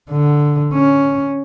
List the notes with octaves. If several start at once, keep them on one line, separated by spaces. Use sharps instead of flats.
D3
C#4